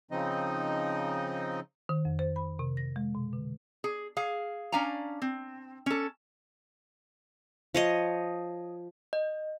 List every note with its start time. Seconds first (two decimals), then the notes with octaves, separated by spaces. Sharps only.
0.11 C#3 F3 C4 D#4 D#5
1.89 D#3
2.05 F2
2.19 C5
2.36 B5
2.59 C3
2.77 A#6
2.96 G#3
3.15 B2
3.33 D3
3.84 G#4
4.17 G#4 F5
4.72 C#4 D4 F5 G#5 A#5
5.22 C4
5.86 C#4 A4
7.74 F3 C#5 D#5
9.13 D#5